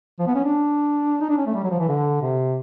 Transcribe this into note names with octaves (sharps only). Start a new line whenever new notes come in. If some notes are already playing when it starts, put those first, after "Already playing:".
F3
B3
C#4
D4
D#4
D4
C#4
A3
G3
F#3
F3
E3
D3
C3